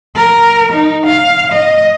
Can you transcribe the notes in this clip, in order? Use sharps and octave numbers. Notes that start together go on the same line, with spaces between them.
A#4
D#4
F5
D#5